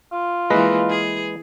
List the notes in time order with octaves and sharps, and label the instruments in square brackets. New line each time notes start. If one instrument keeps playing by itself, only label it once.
[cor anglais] F4
[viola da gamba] E3 A#3 [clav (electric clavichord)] G#3 B4 D#5
[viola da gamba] G#4